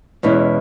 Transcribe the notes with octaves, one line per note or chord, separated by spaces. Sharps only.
E2 B2 G#3 C#4 E4